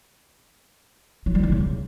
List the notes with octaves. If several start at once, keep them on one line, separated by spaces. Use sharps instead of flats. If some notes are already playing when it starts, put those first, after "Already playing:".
F#3
G3
E4
C#3